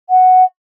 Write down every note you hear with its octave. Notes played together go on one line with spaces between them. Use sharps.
F#5